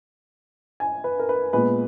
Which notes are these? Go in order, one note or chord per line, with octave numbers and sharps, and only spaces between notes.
G#5
B4
A#4
B4
A#2 G#3 B3 B4